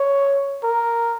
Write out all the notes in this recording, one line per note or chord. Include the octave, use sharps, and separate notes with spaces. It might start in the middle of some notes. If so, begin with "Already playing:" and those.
Already playing: C#5
A#4